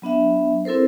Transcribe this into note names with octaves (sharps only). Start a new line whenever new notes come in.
F#3 B3 D4 E5
C4 E4 A4 A#4 C5